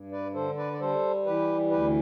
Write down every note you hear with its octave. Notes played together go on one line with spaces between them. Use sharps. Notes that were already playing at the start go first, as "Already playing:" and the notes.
Already playing: G2
B4 D5
D3 A4 C5
B4 D5
D5
G3 A4 C5
E3 G4 B4
D2 G4 B4